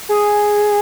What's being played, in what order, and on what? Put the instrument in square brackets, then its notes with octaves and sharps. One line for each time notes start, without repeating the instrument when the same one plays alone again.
[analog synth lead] G#4